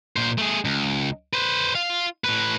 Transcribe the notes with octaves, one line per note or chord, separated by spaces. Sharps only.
A#2 C5
A3 G#4
C#2
B4 C5
F4 F5
A2 B4